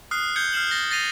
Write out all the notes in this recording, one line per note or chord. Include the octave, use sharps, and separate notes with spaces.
D#6 F6 F#6 C7
G6 G#6 C#7 G7
F6 C7 E7 F#7
A6 A#6 G7
A6 A#6 C7 D#7 F7